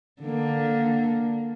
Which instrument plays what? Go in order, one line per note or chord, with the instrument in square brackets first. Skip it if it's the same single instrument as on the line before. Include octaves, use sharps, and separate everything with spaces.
[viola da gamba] D3 A#3